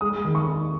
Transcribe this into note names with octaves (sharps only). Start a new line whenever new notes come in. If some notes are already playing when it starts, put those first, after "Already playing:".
G#3 D#6
D#3
C#6
D#4